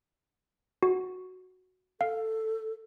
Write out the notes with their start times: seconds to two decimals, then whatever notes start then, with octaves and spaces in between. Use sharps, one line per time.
0.83 F#4
2.01 A4 F5